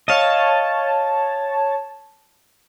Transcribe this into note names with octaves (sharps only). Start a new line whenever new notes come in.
C#5 D#5 F5 A5